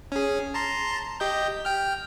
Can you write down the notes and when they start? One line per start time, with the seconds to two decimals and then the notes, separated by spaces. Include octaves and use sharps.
0.12 C#4 G#4
0.54 A5 A#5 C6
1.20 G4 D#5 G6
1.65 G5 F6